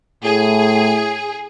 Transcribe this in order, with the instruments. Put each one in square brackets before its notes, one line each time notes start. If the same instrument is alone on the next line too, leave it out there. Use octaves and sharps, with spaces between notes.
[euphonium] A2 [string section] G#4